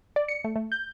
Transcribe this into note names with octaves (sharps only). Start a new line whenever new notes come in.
D5
C#7
A3
A3
G6